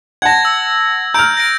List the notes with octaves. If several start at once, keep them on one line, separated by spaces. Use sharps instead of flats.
F#5 A5 G#6 A#6
E6
A#5 F6 G6 D7
A#6 D7